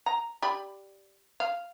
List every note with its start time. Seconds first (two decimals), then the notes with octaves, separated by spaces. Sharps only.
0.06 A#5
0.42 G4 D5 B5
1.40 F5